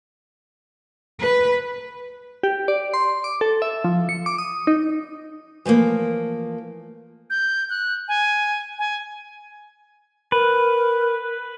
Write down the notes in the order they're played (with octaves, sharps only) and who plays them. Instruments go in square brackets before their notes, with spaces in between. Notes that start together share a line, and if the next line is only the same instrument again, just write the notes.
[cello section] B4
[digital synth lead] G4
D5
C6
D6
A4
E5
F3
C#7
D6
D#6
D#4
[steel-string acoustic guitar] E3 F3 A3 A#3
[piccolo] G6
F#6
G#5
G#5
[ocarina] A#4 [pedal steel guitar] B4